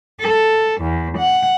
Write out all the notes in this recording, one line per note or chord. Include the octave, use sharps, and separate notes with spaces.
A4
E2
F#5